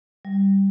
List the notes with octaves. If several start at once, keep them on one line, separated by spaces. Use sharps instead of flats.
G3